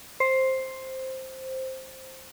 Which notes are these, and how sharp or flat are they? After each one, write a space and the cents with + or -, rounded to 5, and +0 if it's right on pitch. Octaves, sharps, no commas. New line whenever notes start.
C5 +5